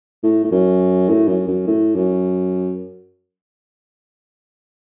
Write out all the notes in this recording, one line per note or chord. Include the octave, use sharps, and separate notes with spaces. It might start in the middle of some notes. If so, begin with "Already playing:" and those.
A2
A2
F#2
A2
F#2
F#2
A2
F#2